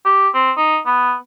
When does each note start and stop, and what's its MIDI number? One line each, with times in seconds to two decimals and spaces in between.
0.05 0.29 67
0.34 0.52 60
0.57 0.79 63
0.86 1.15 59